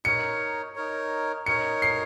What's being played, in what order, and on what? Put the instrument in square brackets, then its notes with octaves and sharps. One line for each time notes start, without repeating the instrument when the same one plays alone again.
[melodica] D#4 A#4 C#5 [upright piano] C#7
[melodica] D#4 A#4 C#5
[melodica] D#4 A#4 C#5 [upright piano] C#7
[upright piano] C7